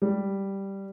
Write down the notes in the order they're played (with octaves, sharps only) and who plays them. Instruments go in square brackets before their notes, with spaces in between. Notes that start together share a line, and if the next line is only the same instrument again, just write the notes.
[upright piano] G3